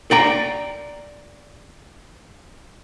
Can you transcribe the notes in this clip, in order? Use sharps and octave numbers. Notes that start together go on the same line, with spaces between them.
D5 G5 A#5